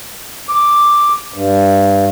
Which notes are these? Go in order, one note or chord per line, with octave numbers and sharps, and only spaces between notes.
D6
G2